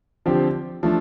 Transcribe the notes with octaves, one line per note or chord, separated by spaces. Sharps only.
D3 F3 C4 G4
F3 A3 D4